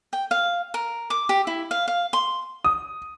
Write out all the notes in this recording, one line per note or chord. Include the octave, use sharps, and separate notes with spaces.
G5
F5
A#4
D6
G4
E4
F5
F5
C6
D#6